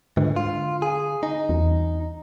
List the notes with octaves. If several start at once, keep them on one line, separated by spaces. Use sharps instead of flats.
G#2 D3
F4
G#4
D#4
E2